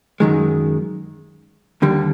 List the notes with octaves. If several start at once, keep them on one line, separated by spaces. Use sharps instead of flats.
F#2 D#3 G#3
D#2 D3 G3